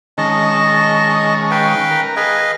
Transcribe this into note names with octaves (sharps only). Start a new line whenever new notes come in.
D#3 G#3 C#4 D#5 A5
B4 F5 G5
A#4
G#4 B4 D#5 F5